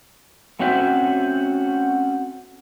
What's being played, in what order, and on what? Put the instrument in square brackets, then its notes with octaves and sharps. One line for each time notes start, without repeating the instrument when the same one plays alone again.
[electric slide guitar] A3 C4 C#4 F#4 C5 E5